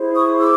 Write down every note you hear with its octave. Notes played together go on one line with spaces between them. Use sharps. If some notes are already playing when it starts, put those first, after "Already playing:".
Already playing: E4 G#4 C5
C#6 D#6
D6 E6